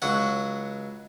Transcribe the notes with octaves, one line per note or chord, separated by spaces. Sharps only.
C#2 F#3 F#5